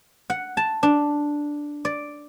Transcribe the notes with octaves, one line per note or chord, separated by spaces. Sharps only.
F#5
A5
D4
D5